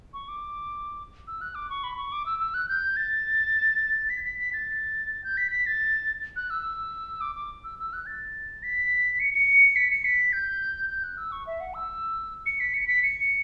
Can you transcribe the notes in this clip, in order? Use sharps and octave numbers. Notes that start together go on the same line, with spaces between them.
C#6
D6
E6
F#6
D6
C#6
B5
C#6
D6
E6
E6
F#6
G6
A6
B6
B6
B6
A6
G6
B6
B6
A6
F#6
E6
D6
D6
E6
E6
F#6
A6
B6
C#7
C#7
B6
C#7
B6
G6
G6
F#6
E6
C#6
E5
F#5
E6
C#7
B6
C#7
B6
C#7